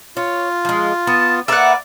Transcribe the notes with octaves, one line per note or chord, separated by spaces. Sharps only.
F4 C#5
F3 G#3
B3 A5
A#3 A#4 B4 D5 E5 F#5